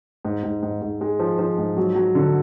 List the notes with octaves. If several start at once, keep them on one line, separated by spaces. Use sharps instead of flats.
G#2
G#2
G#2
G#2
G#3
F3
F3
G#2
F#3
F#3
D3